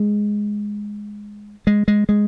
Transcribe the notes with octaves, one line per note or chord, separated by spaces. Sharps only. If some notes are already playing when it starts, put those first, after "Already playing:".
Already playing: G#3
G#3
G#3
G#3